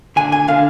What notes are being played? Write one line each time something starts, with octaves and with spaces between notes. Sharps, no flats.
D3 G#5
G#5
D3 F5